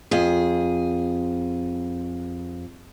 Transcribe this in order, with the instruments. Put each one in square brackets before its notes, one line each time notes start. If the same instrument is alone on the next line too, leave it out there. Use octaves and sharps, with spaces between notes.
[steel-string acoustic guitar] F2 G#4